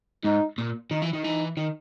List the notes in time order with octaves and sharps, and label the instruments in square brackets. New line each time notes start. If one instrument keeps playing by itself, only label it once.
[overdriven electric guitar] G#2 [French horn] D#4
[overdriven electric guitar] A#2
[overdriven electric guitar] D#3 [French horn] D#4
[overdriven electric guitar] E3
D#3
[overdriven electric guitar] E3 [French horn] D#4
[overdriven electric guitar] D#3